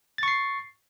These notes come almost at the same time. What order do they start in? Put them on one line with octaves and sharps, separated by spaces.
A6 C#6 C7